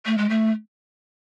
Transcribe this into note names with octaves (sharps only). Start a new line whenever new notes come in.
A3
G#3
A3